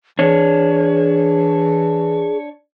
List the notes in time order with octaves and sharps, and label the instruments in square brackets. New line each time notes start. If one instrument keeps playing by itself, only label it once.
[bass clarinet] E3 [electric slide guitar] D4 C#5 [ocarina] G#4